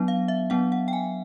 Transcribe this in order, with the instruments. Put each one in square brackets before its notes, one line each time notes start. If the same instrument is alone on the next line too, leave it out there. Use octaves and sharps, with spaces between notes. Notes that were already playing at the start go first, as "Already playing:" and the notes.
Already playing: [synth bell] F#3 B3 D4
F5
E5
F#3 B3 D4 F#5
F#5
G5
G#5